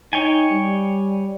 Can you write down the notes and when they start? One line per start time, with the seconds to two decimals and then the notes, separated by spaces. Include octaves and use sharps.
0.13 D#4 C#5 G5 G#5
0.51 G3